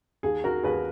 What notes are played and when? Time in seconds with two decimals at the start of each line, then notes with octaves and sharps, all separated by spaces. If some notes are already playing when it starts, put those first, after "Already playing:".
0.23 D#2 G#4
0.44 F#4 A#4
0.63 D#2 G#4 B4